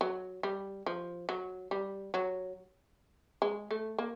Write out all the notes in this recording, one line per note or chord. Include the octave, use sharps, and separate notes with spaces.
F#3
G3
F3
F#3
G3
F#3
G#3
A3
A#3